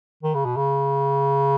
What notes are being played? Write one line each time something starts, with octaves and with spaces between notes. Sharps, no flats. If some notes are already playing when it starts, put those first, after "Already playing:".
D#3
C#3
B2
C#3